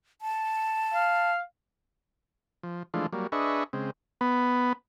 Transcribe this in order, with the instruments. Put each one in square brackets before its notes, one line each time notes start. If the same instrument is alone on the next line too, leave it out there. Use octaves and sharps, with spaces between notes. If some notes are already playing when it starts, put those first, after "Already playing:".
[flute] A5
[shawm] F5
[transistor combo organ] F3
E3 F3 G#3 A3 D4 F4
F#3 G3 A#3
D4 G#4 B4 D#5 E5 C#6
C#3 G#3 C4
B3